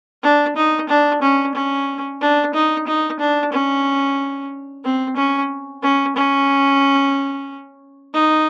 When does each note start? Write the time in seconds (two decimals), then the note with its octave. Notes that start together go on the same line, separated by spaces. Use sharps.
0.23 D4
0.56 D#4
0.89 D4
1.22 C#4
1.55 C#4
2.21 D4
2.54 D#4
2.87 D#4
3.20 D4
3.52 C#4
4.85 C4
5.17 C#4
5.83 C#4
6.16 C#4
8.14 D#4